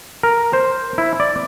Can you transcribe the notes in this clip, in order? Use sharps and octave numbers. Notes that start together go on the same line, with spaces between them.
A#4
C5
E4
D5